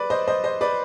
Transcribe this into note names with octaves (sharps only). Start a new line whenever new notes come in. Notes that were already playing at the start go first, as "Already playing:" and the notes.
Already playing: B4 D5
C5 D#5
C5 D#5
C5 D#5
B4 D5